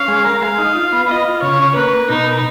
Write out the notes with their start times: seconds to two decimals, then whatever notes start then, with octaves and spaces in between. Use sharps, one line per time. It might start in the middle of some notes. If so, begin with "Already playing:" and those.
Already playing: C#4 F5
0.08 G#3
0.24 A#4
0.42 G#3 F5
0.58 D#4
0.75 F4
0.92 B3
1.09 F4 D#5
1.25 F4
1.42 C#3 C#5
1.59 C#4
1.75 A#3 B4
1.93 A#3
2.10 B2 D#4
2.26 A#4